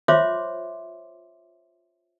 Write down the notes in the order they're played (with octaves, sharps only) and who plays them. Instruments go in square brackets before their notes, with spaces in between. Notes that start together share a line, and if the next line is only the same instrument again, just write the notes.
[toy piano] F4 C5 C#5 E5 C6 D6